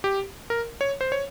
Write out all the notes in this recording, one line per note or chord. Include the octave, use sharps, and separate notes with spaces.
G4
A#4
C#5
C5
C#5